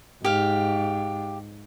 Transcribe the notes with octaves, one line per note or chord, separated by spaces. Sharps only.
G#2 G4 F5